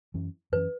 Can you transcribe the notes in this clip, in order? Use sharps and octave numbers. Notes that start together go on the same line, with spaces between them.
F#2 E3 C#4
F#2 E3 C#4 B4